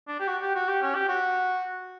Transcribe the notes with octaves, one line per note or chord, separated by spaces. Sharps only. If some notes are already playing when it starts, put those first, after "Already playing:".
D4
G4
F#4
G4
F#4
G4
C#4
G4
F#4